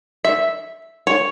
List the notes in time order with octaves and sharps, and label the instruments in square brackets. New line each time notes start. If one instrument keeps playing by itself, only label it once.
[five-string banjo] E5
C#5